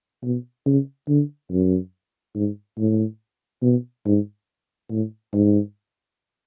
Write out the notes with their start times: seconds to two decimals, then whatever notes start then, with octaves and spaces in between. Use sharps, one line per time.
0.23 B2
0.66 C#3
1.08 D3
1.51 F#2
2.35 G#2
2.78 A2
3.63 B2
4.05 G#2
4.90 A2
5.33 G#2